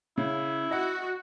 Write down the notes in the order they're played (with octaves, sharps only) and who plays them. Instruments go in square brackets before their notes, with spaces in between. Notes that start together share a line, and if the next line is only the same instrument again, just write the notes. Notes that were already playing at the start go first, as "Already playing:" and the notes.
[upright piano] C#3 [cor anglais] E4
[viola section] F#4 [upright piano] D#5 F#5